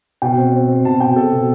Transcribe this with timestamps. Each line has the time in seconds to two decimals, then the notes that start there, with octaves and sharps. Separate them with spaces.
0.22 B2 G5
0.38 C4
0.53 C4
0.68 C4
0.85 B2 A5
1.00 B2 G5
1.16 B2 A4
1.32 B2